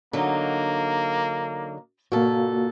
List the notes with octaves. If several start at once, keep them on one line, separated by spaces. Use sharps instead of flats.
D3 F#3 A#3 D#4
A#2 A#3 F#4 A4